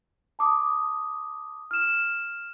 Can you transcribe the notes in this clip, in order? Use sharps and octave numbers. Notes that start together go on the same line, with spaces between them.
A5 D6 D#6
F6 E7